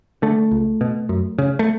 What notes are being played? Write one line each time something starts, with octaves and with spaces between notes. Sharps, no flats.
D3 A3
C#2
B2
F#2
C#3
A3